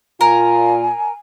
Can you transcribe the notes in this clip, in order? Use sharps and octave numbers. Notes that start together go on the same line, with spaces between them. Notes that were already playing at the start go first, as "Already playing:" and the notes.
A#2 F4 A#4 G#5